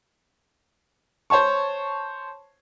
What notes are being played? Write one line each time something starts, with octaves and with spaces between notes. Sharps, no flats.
C5 C#5 A5 C#6